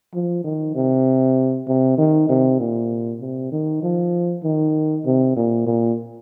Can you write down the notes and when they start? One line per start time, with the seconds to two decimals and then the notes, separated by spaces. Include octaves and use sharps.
0.14 F3
0.44 D#3
0.75 C3
1.68 C3
1.98 D#3
2.29 C3
2.60 A#2
3.21 C3
3.51 D#3
3.83 F3
4.44 D#3
5.06 C3
5.36 A#2
5.67 A#2